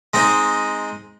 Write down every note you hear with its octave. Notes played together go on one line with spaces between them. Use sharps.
G#3 C4 D#4